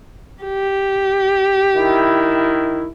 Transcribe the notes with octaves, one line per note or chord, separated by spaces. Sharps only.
G4
D#3 E4